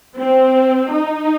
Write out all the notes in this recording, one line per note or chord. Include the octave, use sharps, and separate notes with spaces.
C4
D#4